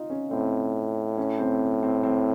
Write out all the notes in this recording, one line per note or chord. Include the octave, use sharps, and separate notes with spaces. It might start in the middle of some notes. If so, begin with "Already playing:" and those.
Already playing: D#4 F4
C#4
A2 C4
C#4
C4
C4
C4